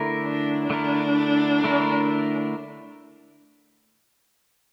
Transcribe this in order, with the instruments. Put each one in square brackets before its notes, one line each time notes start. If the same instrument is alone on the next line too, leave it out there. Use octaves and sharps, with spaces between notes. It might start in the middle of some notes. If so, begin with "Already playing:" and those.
Already playing: [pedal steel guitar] D3 A3 E4 A#4
[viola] D4
[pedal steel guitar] D3 A3 E4 A#4 [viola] D4
[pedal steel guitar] D3 A3 E4 A#4